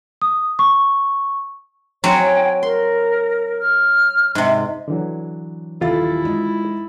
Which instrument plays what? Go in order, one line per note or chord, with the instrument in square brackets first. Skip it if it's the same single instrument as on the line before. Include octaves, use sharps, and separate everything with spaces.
[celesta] D#6
C#6
[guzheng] F#3 C4 F#4 [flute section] C#5 G5 G#5
[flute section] A#4 [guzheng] C6
[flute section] F6
[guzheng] G#2 C3
[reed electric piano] D3 E3 F#3
[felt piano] D#1 A4 A6 [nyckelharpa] E4 [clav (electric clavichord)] F4
[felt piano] G#3 D#4